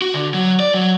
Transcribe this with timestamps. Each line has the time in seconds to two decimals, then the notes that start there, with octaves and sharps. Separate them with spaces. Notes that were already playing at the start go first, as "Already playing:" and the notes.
0.02 F#4
0.14 D3
0.34 F#3
0.60 D5
0.74 F#3